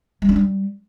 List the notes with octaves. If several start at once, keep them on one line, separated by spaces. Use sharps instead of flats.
G3
D4
G3